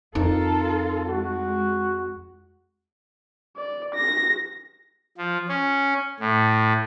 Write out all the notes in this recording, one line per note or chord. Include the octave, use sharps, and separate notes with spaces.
F2 D#4 F4 A4 A#4
G#3 F#4
D5
A#6
F3
C#4
A2